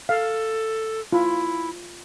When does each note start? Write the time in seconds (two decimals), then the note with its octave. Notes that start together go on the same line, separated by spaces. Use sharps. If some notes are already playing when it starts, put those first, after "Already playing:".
0.09 A4 F5
1.12 E4 F4